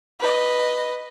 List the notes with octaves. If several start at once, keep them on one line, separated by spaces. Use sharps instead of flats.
B4 D#5